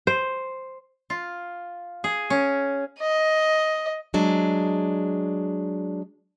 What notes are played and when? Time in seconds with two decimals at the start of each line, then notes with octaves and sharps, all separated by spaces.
0.07 C5
1.10 F4
2.04 G#4
2.30 C#4
3.00 D#5
4.14 F#3 G#3 D4